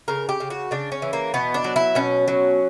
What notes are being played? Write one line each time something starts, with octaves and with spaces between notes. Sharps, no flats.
C#3 A#4
G4
C#3
F#4
C#3 D4
C#4
E3
A#3
B2 B3
D4
F#3
E4
B2 C#4
F#3